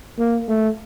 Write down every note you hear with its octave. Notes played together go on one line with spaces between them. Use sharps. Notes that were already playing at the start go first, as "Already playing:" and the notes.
A#3
A3